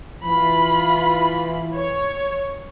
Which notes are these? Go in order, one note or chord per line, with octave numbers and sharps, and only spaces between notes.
E3 F4 B5
C#5